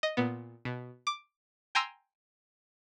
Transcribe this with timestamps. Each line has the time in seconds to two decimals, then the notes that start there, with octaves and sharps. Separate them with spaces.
0.03 D#5
0.17 A#2 B3
0.65 B2
1.07 D6
1.75 G5 G#5 A#5 C6 E6